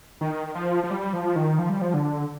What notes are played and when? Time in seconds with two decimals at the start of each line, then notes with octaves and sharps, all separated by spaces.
0.21 D#3
0.55 F3
0.84 F3
0.91 G3
1.13 F3
1.36 D#3
1.59 F3
1.69 G3
1.82 F3
1.94 D3